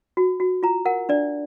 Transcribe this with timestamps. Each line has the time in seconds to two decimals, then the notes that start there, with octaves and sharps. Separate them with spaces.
0.17 F#4
0.40 F#4
0.63 F4 A#5
0.85 A#4 F#5
1.09 D4 D5